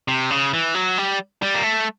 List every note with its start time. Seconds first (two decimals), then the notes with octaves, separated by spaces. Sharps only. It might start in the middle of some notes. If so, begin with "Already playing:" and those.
0.08 C3
0.30 C#3
0.53 E3
0.75 F#3
0.98 G3
1.42 G3
1.55 A#3
1.64 A3